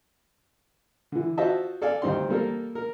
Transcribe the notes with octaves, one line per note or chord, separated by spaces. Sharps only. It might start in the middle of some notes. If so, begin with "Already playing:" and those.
D3 E3
F4 F#4 C5 D#5 E5 A5
A4 D5 F5 G#5
D2 G2 C4 D#4 G4 C6
G3 A#3 A4 A#4
A#4